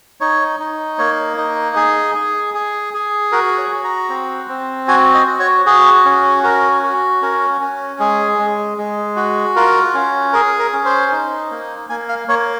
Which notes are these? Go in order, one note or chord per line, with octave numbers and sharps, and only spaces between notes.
D#4 C#5
D#4
A#3 C#5
D#4
G#4
G#4
G#4
G#4
F#4 A#4
C#5
F#4
A#5
C4
C4
F#4 G#5
D#5
F#4
C#5
F#4 G#4
C#4
F#4 A#4
F#4
C#4 A#4
C#4
G#3 G#4
G#3
G#3
F#4
F4 A#4
C#4
G#4 A#4
A#4
C#4
C5
D#4
A#3
A#3 G#5
F5
A#3 C#5